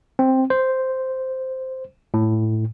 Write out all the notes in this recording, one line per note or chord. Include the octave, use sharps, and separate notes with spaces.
C4
C5
A2